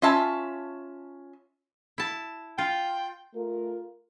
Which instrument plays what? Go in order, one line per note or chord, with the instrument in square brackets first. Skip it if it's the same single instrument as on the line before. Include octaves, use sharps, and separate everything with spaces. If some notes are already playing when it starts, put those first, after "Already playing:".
[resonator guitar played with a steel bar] C#4 F4 E5 A5
[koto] E4 A5
[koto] F4 [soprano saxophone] G5
[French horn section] A3 F4 A#4